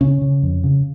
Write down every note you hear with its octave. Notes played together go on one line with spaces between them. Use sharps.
C#3 C#4
C#3
F2
C#3